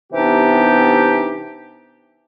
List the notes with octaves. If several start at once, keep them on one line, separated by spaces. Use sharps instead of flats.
C3 E3 B3 D4 D#4 G4